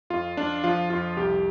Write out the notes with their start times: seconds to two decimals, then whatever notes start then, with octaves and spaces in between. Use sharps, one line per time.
0.10 F2 F4
0.37 F2 D4
0.64 F3 F4
0.90 F2 F4
1.17 C2 G4